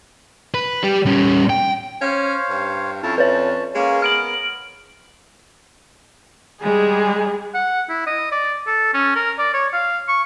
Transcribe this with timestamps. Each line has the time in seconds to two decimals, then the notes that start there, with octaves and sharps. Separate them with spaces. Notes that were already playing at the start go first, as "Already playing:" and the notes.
0.54 B4
0.83 G3 G4
1.06 G3 C#4
1.50 G5
2.01 C#4 C5 C#5 F5
2.49 G2
3.03 F2 C#4 E4 A5
3.18 C#4 B4 C#5 A5
3.75 G#3 A#3 C#4
4.02 B3 A#4 F6 D7 F#7
6.62 G3 G#3 G#4
7.55 F#5
7.89 E4
8.07 D#5
8.32 D5
8.67 A4
8.94 C#4
9.16 A#4
9.39 D5
9.54 C#5
9.73 F5
10.08 C#6